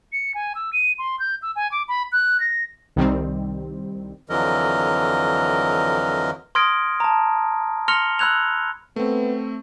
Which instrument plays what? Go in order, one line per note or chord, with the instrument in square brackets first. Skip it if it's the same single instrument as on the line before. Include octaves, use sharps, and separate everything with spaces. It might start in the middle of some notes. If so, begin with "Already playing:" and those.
[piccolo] C#7
G#5
E6
D#7
C6
G6
E6
G#5
D6
B5
F#6
A#6
[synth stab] C2 D#3 G3 C4
[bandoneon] F2 D3 E3 F#3 A#4 D#5
[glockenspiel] C6 D#6 F6 G#6 A#6 D7
A5 A#5
C6 F6 A#6 C#7 F7 G7
B5 E6 F#6 G#6 F7
[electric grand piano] A3 C4 [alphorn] B3